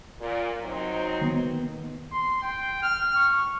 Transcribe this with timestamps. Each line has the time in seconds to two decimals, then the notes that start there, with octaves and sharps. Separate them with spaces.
0.19 A#2
0.62 F#3 C4 D#4
1.21 D#3 A#3 B3
2.12 C6
2.42 G5
2.82 F6
3.16 C#6